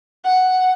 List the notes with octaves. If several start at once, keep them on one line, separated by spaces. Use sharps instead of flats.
F#5